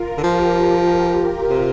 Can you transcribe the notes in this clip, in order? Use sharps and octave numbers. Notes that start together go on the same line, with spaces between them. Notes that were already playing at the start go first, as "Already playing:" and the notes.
Already playing: F4 A#4
D3
F3 G4
C3